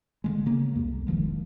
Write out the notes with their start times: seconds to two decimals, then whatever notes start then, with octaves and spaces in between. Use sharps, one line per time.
0.24 D3 E3 G#3
0.46 C#3 A#3
0.74 C2 F2 A#3
1.07 E1 D#3 F3 G#3